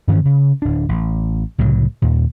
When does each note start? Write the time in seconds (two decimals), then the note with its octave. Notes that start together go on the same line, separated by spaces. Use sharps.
0.08 G2 D#3 E3 C#4
0.25 C#3
0.62 D1 D4
0.89 A1
1.58 C2 A2 C#3 F#3
2.02 D#2 A#2